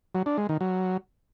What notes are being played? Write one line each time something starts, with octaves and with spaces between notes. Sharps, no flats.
F#3
D4
G#3
D#3
F#3